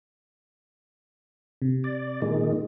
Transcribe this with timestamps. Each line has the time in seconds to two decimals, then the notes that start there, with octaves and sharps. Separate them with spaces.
1.62 C3
1.84 D5
2.22 A#2 D#3 G#3